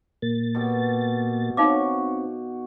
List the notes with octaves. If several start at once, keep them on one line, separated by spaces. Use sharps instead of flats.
A#2 A#3 A6
B2 G4
C4 D#4 F#4 C#5 F5 D6